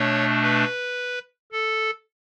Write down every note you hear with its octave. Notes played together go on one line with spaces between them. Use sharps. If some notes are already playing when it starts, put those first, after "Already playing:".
Already playing: B2 A3 D4 C#5
B4
A4